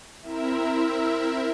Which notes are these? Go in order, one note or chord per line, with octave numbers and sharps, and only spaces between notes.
C4 E4 A#4 E5